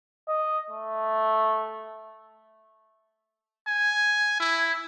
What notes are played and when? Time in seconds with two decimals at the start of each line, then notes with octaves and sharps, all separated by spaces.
0.28 D#5
0.71 A3
3.67 G#5
4.40 E4